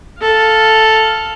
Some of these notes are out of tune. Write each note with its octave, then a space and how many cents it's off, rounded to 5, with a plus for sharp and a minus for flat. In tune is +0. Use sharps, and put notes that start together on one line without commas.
A4 +0 F5 +0